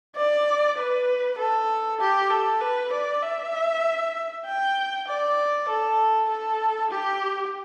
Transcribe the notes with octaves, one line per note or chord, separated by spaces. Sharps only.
D5
B4
A4
G4
A4
B4
D5
E5
G5
D5
A4
A4
G4